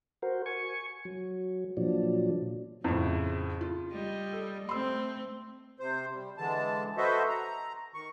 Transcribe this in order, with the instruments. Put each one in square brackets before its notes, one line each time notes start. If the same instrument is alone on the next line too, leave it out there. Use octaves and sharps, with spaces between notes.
[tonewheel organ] F#4 A#4 C5
G#5 C#6
F#3
A#2 F3 F#3 D4
[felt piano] F2 A2 [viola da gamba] C#3
[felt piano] F4
[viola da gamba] G3 D#5
[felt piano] A4
[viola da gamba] A3 C4 [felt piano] C6 E6
[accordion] C3 C5
G3
D3 E3 G#3 A5
F#4 A4 B4 C5 D#5 E5
A#5
D#3 C#6